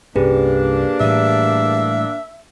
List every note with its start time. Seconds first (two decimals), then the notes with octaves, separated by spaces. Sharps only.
0.16 C2 G2 A#3 C#4 D4 G4 G#4 B4
1.00 A2 E3 G3 E5